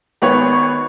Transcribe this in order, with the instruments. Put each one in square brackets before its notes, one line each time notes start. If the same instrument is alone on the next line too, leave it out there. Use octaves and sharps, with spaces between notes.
[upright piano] G#1 D#3 B3 B4 C#5 C#6